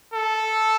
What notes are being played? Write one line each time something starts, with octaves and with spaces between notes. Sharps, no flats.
A4